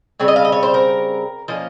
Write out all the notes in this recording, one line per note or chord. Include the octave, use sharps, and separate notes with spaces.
C#3 G3 C4 C#5
D#5
F5
D#5
C#5
C5
A#4
F3 A#3 C#4 D#5